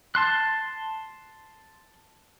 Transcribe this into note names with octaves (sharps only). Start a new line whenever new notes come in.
A5 C6 F#6